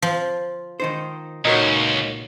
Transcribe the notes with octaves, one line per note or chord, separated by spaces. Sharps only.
F3
D#3 D#4 C5
C#2 A#2 D#4 F#4 A#4 C#5